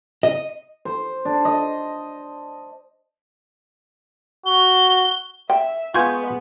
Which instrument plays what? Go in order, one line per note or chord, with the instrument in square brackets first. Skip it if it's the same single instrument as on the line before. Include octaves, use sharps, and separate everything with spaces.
[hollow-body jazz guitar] D#5
[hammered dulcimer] C5
D4
D#5
[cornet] F#4 [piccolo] G7
[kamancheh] E5 [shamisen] G5
[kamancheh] G#3 B3 [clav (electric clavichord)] F4 G#5 [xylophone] C#6 G6